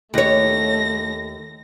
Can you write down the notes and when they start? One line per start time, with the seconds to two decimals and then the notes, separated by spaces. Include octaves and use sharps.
0.14 D#2 A3 C#5 A#6